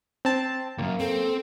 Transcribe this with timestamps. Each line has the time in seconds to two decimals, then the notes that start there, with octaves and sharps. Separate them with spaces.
0.25 C4 A5
0.78 C2 F#2 A#3
1.00 C4 A4